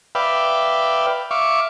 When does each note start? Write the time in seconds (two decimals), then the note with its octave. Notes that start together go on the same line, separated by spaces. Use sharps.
0.15 B4 D5 E5 F5 G5
1.31 E5 F5 C#6 D6